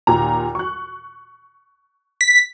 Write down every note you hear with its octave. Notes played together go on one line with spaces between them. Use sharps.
D#2 A#2 A#5
C#6 F#6
B6